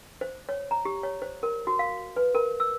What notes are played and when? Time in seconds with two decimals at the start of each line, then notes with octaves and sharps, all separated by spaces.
0.21 C5
0.49 C#5
0.71 A#5
0.85 G4
1.03 C#5
1.22 C5
1.43 A#4
1.67 F#4
1.79 F5
2.16 B4
2.35 A#4
2.60 E6